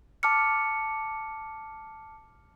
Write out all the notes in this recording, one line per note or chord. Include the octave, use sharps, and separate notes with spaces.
A5 D6 F6 C#7